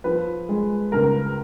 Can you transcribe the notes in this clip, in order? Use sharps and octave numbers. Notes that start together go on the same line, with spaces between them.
F3 B4
G#3
C#2 A#4